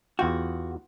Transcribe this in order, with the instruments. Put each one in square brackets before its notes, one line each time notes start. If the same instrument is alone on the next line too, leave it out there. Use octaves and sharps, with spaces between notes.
[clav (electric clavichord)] E2 F4 G5 [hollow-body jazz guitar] F#4